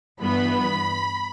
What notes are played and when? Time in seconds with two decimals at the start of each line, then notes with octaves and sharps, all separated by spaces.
0.20 G2 E3 B3 B5